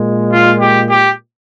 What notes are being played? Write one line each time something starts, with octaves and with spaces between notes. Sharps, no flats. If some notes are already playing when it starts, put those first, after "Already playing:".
Already playing: A#2 G#3
F4
G4
G4